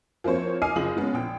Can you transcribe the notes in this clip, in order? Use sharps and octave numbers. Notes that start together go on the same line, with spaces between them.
F3 A#3 C4 C5 C#5
D#5 G#5 D6 F6 C7 D#7
F#1 F4 G#4 D#6 F#7
G#3 B3 C#4
A#1 G5